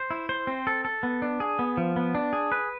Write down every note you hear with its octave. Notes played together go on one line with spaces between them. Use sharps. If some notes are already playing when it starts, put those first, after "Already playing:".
Already playing: C5
E4
C5
C4
A4
A4
B3
D4
G#4
B3
F3
B3
D4
G#4
B4